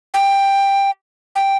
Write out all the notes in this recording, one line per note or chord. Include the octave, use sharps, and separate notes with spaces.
G5
G5